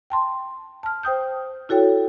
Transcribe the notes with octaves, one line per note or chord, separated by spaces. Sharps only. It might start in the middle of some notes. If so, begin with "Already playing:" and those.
G5 A5 C6
A5 F6
C5 G5 D#6 G6
E4 F#4 A4 C#5 G5